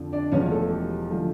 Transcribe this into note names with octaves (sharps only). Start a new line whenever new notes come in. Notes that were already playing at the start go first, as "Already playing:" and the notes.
Already playing: F2 D3 F3
D4 D5
E1 E2 C#3 F3 C#4 C#5
A3 A4
G4
D3 F3 A3